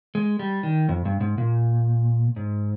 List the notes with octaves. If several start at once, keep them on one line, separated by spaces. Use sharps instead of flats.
G#3
G3
D#3
F2
G2
G#2
A#2
G#2